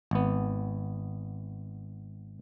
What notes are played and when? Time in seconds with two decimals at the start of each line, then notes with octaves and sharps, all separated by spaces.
0.11 G#1 B3